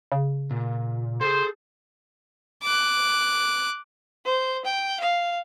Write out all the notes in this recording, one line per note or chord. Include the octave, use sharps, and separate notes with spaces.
C#3
A#2
G#4 A4 C5
D6 F#6
C5
G5
F5